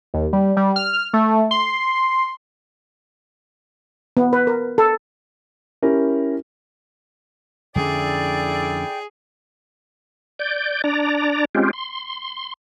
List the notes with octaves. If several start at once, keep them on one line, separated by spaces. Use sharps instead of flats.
D#2
G3
G3
F6
A3
C6
B3
B4
A#4
A4
C#4 E4 G4 A#4
F2 D3 C#4 E4 G#4 A4 D5 G5
D5 G6
D4 D5 A#5
G#3 C4 C#4 F4 G4
C6